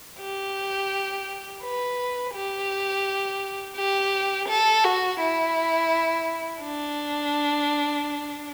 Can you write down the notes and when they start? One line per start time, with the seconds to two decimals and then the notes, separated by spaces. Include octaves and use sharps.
0.20 G4
1.63 B4
2.34 G4
3.76 G4
4.48 A4
4.84 F#4
5.19 E4
6.62 D4